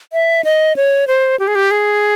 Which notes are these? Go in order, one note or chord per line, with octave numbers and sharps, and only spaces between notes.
E5
D#5
C#5
C5
G4
G#4
G4
G#4